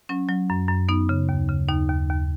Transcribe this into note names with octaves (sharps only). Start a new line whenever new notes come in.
F#3 C#4
F#3
F#2
F#2
B3 D#4
C#3
D#2
C#3
D#2 D#4
D#2
D#2